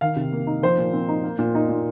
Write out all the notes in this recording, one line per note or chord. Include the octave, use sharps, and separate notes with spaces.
D#3 F5
C3
A#3
D#4
F3 C5
A#2
C4
D#4
A#3
A#2
D#4
A#2